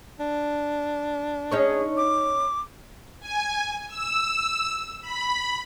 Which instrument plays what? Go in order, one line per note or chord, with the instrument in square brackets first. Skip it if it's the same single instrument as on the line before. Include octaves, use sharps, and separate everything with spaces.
[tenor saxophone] D4
[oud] C#4 D#4 C#5 [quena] G#4
[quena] D6
[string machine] G#5
E6
B5